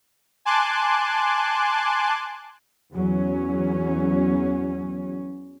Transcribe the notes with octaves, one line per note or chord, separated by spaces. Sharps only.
G#5 A5 C6 D6 F#6
E2 F#3 C#4